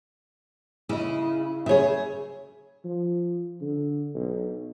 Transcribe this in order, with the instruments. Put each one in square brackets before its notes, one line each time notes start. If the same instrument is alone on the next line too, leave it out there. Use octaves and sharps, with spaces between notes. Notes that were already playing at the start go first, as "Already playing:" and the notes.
[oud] C#3 [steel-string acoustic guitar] E4 D#5
[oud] C#3 C#5 [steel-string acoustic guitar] G#4 E5
[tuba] F3
D3
B1